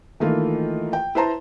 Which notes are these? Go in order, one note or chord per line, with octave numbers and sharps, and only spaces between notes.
D#3 E3 A3 A#3 F4
G5
E4 B4 C5 A5 A#5 C6